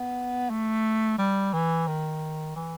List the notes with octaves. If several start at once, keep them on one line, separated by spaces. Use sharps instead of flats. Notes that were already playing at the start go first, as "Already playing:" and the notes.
Already playing: B3
A3
G3
E3
D#3
E3